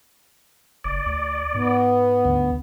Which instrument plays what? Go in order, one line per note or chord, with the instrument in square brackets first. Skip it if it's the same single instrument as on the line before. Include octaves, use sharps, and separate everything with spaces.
[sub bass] F#1 [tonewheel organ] D5
[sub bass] D2
[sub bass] G#2 [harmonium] B3
[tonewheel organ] D2